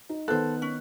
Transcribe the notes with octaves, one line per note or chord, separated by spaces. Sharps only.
D#4
D#3 B3 A4 C5 F#6
C#4